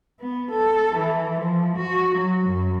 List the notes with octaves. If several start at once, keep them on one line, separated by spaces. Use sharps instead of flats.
B3
A4
E3
F3
F#4
F#3
F#2